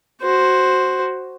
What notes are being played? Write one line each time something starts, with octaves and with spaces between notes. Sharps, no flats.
F#4 C5